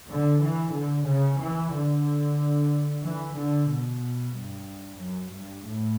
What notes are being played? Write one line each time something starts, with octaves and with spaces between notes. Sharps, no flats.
D3
E3
D3
C#3
E3
D3
E3
D3
B2
G2
F#2
G2
A2